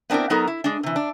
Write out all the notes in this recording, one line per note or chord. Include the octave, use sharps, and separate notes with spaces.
B3 C4 D4 E4 A#4
F#3 B3 D#4 A4 A#4
E4
G#3 D4
C3 E3
D4